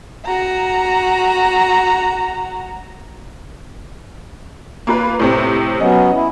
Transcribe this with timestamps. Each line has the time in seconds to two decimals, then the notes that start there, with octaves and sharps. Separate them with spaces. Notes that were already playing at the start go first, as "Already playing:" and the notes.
0.25 F#4 A#5
4.87 A#3 F4 B4
5.19 A2 C3 C4
5.80 F#3 B3 C#4 D#5
6.12 E4